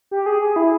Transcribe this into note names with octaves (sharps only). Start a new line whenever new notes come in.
G4
G#4
G#4
E4